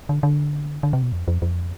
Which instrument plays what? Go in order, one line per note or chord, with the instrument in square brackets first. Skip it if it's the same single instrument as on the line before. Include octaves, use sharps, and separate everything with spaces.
[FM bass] D3
D3
D3
C3
B2
F2
F2
F2